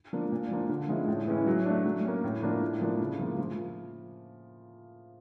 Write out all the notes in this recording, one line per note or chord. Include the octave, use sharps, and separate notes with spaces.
F3 A#3 D4
A#2
F3 A#3 D4
D3
F3 G#3 C#4 E4
A2
E3 G#3 C#4 E4
F#3
A3 D4
F#3
A#3 C#4
A2
F3 A#3 D4
A2
F3 A#3 D4
C#3
F3 A#3
F3